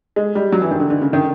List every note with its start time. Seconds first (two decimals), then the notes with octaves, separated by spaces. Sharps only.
0.16 G#3
0.35 G3
0.52 F#3
0.62 E3
0.71 D#3
0.80 D3
0.90 D3
1.01 C#3
1.13 D#3